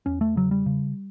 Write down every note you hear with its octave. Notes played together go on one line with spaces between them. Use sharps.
E2 C#4
A3
C#3 F#3
G3
C#3